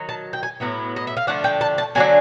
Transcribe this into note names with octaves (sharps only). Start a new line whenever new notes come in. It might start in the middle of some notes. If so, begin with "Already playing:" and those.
Already playing: D#3 F#3
A5
G5
G#5
A2 F#3 B3 E4
D#5
E5
F5
D3 F3 A3 D4 F#5
G5
A5
A5
D3 F#3 A3 D4 G#5